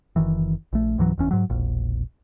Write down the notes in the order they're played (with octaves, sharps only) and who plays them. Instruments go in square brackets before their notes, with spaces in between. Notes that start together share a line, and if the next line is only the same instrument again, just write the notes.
[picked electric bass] F#1 D#3 E3
A#1 A3
C#2 G#2 E3 F#3
F1 E2 C#4
G#2 F#3
E1 A#1